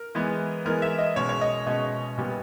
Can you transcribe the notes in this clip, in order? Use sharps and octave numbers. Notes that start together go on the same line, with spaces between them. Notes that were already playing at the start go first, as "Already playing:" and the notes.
Already playing: A#4
E3 G#3 B3
E3 G#3 B3 A#4
E5
D#5
B2 G#3 C#4 C#5
C#5
D#5
B2 G#3 C#4 D#5
A#2 G3 B3